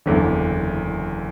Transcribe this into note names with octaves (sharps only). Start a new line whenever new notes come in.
F#1 E2 D3